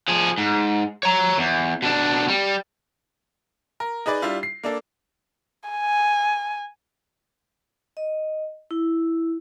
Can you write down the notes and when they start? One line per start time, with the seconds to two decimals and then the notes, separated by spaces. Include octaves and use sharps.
0.08 F3 G#4
0.38 G#2
1.03 C#5 A#5
1.38 E2
1.82 B2 D4
2.28 G3
3.80 A#4
4.06 D#4 G#4 B4 D5
4.22 G3 D4 E4 F4
4.43 C7
4.63 A#3 D4 A4
5.69 G#5
7.97 D#5
8.71 E4